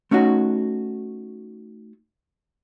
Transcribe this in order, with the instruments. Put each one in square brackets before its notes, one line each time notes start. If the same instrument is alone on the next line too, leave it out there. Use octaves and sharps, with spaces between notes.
[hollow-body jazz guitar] A3 C#4 D#4 F#4